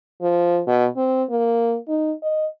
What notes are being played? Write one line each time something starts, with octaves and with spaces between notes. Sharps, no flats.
F3
B2
C4
A#3
D#4
D#5